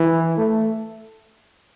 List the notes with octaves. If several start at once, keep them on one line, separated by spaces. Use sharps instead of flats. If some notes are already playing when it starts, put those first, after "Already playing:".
Already playing: E3
A3